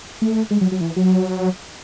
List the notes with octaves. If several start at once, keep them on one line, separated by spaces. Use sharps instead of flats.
A3
G#3
F#3
F#3
E3
F#3